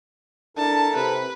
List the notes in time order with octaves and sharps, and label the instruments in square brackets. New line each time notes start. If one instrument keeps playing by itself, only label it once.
[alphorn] D4 [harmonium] E4 A4 A#4 [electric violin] A5
[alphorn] C3 [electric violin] B4